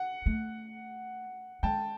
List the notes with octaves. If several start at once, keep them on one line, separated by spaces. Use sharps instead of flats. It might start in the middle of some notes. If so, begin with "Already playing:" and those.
Already playing: F#5
A3
G#3 G5 A5